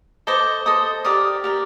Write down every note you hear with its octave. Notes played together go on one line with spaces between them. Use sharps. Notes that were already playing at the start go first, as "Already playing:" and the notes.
A4 C5 D#5 D6
A4 C5 D#5 D#6
G4 A#4 D5 D#6
G4 A#4 D5